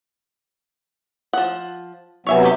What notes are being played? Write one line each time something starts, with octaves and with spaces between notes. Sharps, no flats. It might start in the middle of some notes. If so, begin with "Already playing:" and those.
F3 F#5
C3 F#3 B3 C#5 E5 G#5
D#3 A3 G4